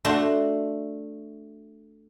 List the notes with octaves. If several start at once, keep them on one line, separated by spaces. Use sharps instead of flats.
A3 D4 F#4 C5